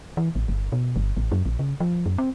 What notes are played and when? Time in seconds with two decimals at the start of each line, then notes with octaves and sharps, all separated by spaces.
0.17 E3
0.35 A1
0.48 G1
0.72 B2
0.96 G1
1.17 A1
1.32 F#2
1.46 A#1
1.59 C#3
1.80 F3
2.06 F#2
2.18 C4